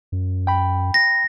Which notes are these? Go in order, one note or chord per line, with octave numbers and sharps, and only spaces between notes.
F#2
G5 B5
A#6